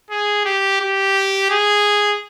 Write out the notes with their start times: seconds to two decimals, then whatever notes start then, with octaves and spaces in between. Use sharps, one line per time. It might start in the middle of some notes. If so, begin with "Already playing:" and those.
0.10 G#4
0.45 G4
0.80 G4
1.50 G#4